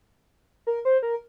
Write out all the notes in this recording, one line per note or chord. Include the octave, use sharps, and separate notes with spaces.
A#4
C5
A#4